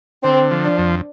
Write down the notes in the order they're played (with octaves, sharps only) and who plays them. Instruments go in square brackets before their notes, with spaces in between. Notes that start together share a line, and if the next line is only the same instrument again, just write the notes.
[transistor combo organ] D3 [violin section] C4
[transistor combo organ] F3
[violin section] D4
[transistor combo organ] F2